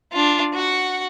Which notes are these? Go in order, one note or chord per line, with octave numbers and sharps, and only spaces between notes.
D4 F4
F#4 F#5